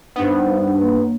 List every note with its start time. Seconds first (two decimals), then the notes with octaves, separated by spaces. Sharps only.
0.16 G2 B3 D4 D#4 C5
0.80 A#3 C#5